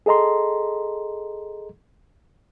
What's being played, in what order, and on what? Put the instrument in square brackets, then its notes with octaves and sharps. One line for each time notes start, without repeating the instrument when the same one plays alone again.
[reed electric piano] G#4 A4 D#5 A#5 C6